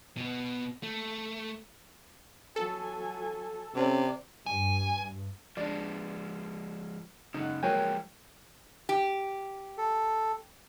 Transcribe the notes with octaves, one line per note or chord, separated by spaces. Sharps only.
B2 B3
A3
F#3 A4 G#5
C3 C#4 D5
G2 G#5
F3 G#3 D4 D5
F#2 C#3 D#4 F#5
F3 F#3 G#3 A#3 G5 G#5
G4
A4